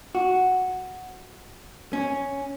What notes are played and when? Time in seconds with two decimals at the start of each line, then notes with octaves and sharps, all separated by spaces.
0.15 F#4
1.93 C#4